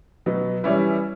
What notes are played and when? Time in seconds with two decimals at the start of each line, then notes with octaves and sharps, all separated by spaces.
0.26 B2 F#3 B3
0.63 E3 G3 C#4 E4 B4